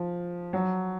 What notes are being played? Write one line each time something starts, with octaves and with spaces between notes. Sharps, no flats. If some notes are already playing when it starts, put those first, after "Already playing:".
Already playing: F3
F#3